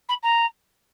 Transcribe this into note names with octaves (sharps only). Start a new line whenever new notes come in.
B5
A#5